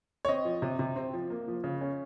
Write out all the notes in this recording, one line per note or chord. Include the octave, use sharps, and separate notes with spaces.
C#5
C4 D#5
F3
C3
C3
C4
F3
A#3
F3
C#3
C#4